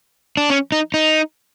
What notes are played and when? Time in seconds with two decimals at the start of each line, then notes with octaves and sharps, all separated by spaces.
0.37 D4
0.50 C#4
0.72 D#4
0.94 D#4